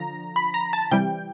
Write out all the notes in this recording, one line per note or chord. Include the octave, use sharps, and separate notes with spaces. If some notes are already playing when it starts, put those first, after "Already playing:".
Already playing: D3 F3 A#5
B5
A#5
A5
C3 E3 G3 G5